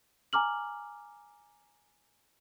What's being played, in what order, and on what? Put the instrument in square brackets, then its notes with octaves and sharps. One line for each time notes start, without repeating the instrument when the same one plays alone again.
[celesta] G#5 A#5 D6 F6 F#7